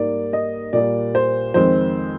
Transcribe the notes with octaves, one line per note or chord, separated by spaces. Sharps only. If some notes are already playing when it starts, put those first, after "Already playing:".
Already playing: G#2 G3 A#3 D5
D#5
A#2 G3 A#3 D5
C5
F2 D#3 G#3 C4 C5